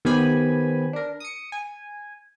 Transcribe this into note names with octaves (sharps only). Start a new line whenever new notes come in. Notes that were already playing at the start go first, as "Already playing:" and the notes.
D#3 B3 G4 C5 G#5 B5
D4 A#4
D#6 C#7
G#5